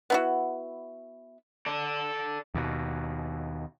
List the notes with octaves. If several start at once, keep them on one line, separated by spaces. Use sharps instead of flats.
B3 E4 F#4
A4 D5
D#2 B2